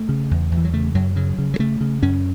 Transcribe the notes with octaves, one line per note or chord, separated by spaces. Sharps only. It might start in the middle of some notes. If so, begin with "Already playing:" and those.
Already playing: A3
C#3
E2
E2
E3
F#3
C#3 A3
F#2 F#3
C#3 F#3
C#3
F#3
C#3 A3
C#3
F#2 C#4